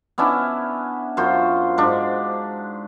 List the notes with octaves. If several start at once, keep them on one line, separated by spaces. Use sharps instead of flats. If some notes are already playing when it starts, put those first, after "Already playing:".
B3 C#4 D4 E4
F#2 F4 F#4 C5
G#2 D4